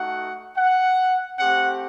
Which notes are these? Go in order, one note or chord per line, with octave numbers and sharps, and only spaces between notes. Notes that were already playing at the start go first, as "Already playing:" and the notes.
Already playing: A3 D#4 F#4 F#5
F#5
A3 C4 G4 F#5